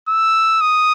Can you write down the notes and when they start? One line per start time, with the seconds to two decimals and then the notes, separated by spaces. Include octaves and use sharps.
0.08 E6
0.61 D#6